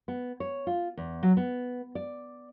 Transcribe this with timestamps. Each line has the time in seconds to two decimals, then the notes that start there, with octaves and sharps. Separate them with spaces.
0.08 B3
0.40 C#5
0.67 F4
0.97 E2
1.23 F#3
1.37 B3
1.95 D5